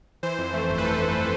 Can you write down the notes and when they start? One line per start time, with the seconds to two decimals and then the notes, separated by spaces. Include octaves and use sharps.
0.23 E3 C5
0.38 F2
0.54 A3
0.69 G1
0.78 B4
0.85 A3 A4
0.99 F2